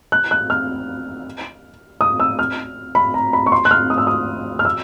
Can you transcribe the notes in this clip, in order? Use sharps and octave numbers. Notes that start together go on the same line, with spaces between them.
F#6
F#6
F6
D#6
E6
F6
B5
A#5
B5
C#6
C6
F#6
F6
D#6
E6
D#6
F6
E6